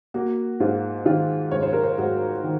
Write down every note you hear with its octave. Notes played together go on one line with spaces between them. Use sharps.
A#3 F#4
G#2 F4
D#3 F4
G#2 C#5
C5
A#4
C5
G#2 F#4
D#3